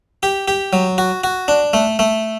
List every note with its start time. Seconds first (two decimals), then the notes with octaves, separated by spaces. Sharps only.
0.23 G4
0.48 G4
0.73 F#3
0.98 F#4
1.24 F#4
1.48 D4
1.73 A3
1.99 A3